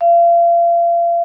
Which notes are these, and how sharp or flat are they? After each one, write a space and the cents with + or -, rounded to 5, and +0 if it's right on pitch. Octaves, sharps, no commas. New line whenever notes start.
F5 -35